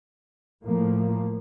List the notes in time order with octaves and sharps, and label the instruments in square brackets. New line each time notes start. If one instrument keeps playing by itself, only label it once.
[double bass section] A2 F3 A#3